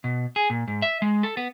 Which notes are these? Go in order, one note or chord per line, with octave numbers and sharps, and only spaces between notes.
B2
G#4
A#2
G#2
E5
G#3
A4
B3